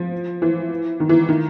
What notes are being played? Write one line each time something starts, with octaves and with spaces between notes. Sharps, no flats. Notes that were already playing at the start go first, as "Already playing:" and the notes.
Already playing: F3
E3
D#3
E3
D#3